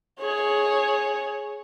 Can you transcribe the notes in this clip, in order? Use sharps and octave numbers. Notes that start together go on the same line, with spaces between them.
G#4 C#5